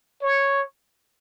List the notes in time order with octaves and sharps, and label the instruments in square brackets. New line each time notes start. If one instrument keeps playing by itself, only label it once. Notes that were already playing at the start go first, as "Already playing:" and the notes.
[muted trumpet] C#5